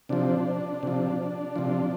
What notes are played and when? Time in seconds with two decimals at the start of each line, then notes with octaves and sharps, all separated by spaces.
0.09 C3 F3 D4
0.83 C3 F3
1.56 C3 F3